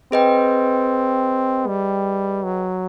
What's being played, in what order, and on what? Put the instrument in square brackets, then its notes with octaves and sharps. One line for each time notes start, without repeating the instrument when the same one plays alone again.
[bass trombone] C4 [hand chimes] G#4 B4 D#5 G5
[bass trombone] G3
F#3